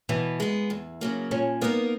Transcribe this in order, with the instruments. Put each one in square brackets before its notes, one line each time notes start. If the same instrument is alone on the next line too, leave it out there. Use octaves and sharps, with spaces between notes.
[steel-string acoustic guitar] B2 [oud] E3
[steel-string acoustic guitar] G#3 B3
E2
C#3 F#3 A#3
[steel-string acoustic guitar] A#2 [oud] C#4
[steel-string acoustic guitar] A#3 D#4 A#4 [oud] B3